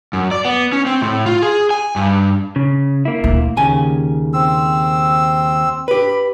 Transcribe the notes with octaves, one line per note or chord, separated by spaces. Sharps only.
F#2
D5
B3
C#4
C4
A2
F4
G#4
G#5
G2
C#3
A#3 E4
D2 A#2
D#2 C#3 G#5
C4 E6
G4 B4 B5